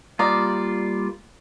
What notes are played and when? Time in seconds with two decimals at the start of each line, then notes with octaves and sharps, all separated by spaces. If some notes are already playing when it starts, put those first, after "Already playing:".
0.19 G3 A#3 F4 D5 A#5 D#6